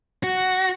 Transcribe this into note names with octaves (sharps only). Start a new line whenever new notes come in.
F#4